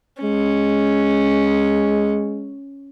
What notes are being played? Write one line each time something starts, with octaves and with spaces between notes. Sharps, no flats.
G#3 C#4